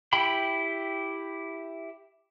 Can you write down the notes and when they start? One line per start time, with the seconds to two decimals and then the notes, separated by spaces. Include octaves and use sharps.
0.13 E4 G4 G5 B5